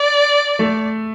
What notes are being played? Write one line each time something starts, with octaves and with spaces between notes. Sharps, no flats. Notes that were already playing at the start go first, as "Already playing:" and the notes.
Already playing: D5
A3